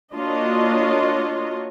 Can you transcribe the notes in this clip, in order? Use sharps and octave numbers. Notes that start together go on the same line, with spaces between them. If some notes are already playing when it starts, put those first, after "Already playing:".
A#3 D4 F4 F#4 C#5 D#5